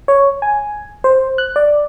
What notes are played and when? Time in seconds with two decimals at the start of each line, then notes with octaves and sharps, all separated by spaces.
0.08 C#5
0.42 G#5
1.04 C5
1.38 F#6
1.56 D5